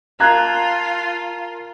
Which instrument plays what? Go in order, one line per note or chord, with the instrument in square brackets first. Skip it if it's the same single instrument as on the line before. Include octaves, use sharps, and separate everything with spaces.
[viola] F4 [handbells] A#4 F5 A5 [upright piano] A#5 F#6 G#6